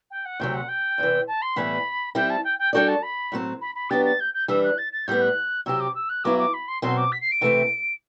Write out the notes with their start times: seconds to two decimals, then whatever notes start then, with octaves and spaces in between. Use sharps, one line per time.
0.10 G5
0.25 F#5
0.40 D2 C3 F#3 G5
0.54 F#5
0.68 G5
0.98 E2 C3 E3
1.27 A5
1.42 C6
1.56 A2 E3 G3 B3 E4 B5
2.15 G3 C4 E4 G5
2.30 A5
2.44 G5
2.59 G5
2.73 G3 D4 F#4 A4 D5 G5
2.88 A5
3.03 B5
3.32 A2 F#3 C4
3.61 B5
3.75 B5
3.90 F#3 B3 D4 G4 A6
4.05 A6
4.20 G6
4.34 G6
4.48 E3 G3 D4 E6
4.63 F#6
4.78 A6
4.93 A6
5.07 A2 G3 B3 G6
5.21 F#6
5.66 C3 F#3 C4 G4 E6
5.80 D6
5.95 E6
6.09 F#6
6.24 G2 F#3 B3 E4 D6
6.38 D6
6.53 B5
6.68 C6
6.82 B2 F#3 C4 C6
6.97 D6
7.12 B6
7.21 C7
7.31 D7
7.41 C3 E3 A3 C4